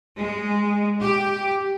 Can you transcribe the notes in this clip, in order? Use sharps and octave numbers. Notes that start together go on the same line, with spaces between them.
G#3
G4